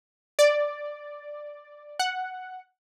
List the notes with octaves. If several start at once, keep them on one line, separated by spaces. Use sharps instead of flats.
D5
F#5